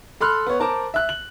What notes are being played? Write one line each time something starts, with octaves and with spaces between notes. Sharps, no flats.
A4 B5 C6 F6 F#6
B3 C#5
A#4 C5 A5 A#5 D6
E5 F#6
F#7